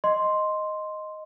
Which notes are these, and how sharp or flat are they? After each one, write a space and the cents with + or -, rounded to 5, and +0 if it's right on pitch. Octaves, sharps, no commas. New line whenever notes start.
D#5 +0 C6 +0